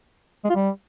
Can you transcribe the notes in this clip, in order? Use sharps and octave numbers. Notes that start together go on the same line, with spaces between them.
G#3
F4
G3